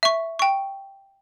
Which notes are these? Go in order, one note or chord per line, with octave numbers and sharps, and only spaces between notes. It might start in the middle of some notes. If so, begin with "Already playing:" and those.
E5 C#6
G5 C#6